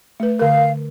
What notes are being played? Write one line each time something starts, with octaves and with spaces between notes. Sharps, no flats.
A3 B4
D3 A#4 F5